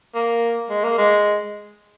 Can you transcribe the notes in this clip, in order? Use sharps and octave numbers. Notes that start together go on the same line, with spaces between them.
A#3
G#3
A#3
G#3